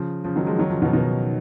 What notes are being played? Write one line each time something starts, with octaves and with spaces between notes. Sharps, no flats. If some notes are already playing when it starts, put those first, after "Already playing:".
Already playing: C#3 F3
C#3 F3
D#3 F#3
F3 G#3
D#3 F#3
C#3 F3
B2 D#3
B2 D#3